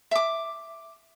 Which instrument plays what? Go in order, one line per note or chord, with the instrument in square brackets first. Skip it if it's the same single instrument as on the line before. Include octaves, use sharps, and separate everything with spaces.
[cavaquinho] E5 D6